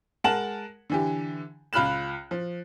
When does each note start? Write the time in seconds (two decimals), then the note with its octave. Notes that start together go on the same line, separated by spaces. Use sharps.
0.24 G#3 A#4 F#5 A5 E7 F#7
0.90 D3 E3 G4
1.73 C#2 F4 B5 F6 F#6 E7
2.31 F3